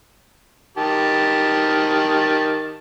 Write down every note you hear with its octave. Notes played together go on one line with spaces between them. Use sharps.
D#3 G4 A5